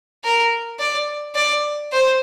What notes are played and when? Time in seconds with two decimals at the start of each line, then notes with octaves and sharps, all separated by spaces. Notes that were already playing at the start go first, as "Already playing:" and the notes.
0.24 A#4
0.79 D5
1.35 D5
1.92 C5